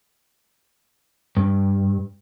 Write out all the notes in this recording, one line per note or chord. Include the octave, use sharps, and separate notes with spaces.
G2